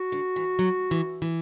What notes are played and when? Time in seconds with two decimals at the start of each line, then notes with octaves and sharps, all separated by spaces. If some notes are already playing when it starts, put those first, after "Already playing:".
Already playing: F#4
0.12 D3
0.36 E3
0.59 F#3
0.91 E3
1.22 E3